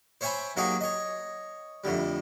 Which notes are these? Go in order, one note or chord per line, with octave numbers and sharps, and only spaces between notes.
C5 C#5 E5 G5 G#5 B5
F#3 A#3 D#4 G4 G#4 C#5
C#5 D#5
F2 A2 D3 G3